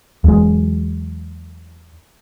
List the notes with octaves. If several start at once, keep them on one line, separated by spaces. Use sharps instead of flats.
E2 F#3 G#3